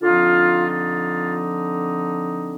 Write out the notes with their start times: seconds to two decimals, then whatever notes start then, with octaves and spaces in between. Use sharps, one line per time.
0.02 D3 F3 C4 D#4 F4
0.69 F4